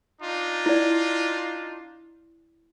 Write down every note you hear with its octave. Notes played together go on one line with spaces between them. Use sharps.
D4 D#4 F4
E4 D5